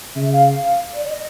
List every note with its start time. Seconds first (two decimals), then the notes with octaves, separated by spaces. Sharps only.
0.16 C#3 E5
0.31 F5
0.47 F5
0.62 F5
0.93 D5
1.04 D5
1.09 D#5